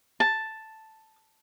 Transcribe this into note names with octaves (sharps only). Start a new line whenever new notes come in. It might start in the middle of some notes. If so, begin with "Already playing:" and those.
A5